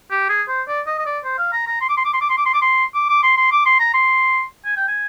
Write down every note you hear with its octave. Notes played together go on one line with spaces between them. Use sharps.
G4
G#4
C5
D5
D#5
D#5
D5
C5
F5
A#5
A#5
C6
D6
C6
D6
C6
D6
C6
D6
C6
D6
C6
D6
D6
C6
C6
D6
C6
A#5
C6
G#5
G5
G#5